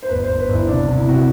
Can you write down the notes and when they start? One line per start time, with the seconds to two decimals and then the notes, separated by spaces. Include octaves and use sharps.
0.03 C5
0.09 G1 B4
0.24 C5
0.29 G1
0.39 B4
0.49 G1 E4
0.68 C2 D4
0.87 C2
0.97 E4
1.07 C3 F#4